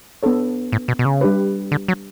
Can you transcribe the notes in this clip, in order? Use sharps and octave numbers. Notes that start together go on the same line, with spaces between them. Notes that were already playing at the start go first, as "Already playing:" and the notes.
B3 D4 A4 C#5
A2
B2
B2
C#3
G3 D4 G4 B4
D3
F#3